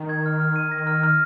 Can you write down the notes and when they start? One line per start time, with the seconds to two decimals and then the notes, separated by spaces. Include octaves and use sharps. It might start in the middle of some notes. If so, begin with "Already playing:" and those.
Already playing: D#3
0.09 G#6
0.26 F6
0.40 F6
0.56 D#7
0.71 A#6
0.87 F6
1.03 F6